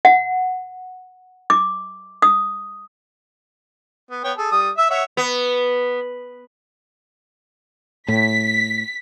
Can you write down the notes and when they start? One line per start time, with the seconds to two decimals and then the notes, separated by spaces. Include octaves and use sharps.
0.05 F#5
1.50 D6
2.22 D#6
4.11 B3
4.24 B3 C#5 G5
4.38 G#4 A4
4.51 G3 D#6
4.78 E5 E6
4.90 C#5 E5 F#5
5.17 B3
8.08 A2 B6